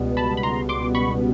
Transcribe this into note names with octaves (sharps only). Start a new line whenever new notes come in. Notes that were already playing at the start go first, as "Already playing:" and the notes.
Already playing: C#2 B2 G3 B3
A5 B5
B5
A#5 C6
C6 D6
B5 C#6